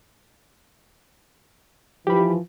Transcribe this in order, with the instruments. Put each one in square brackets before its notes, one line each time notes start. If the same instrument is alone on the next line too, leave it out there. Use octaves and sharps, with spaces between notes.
[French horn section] E3 F3 [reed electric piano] G4 B5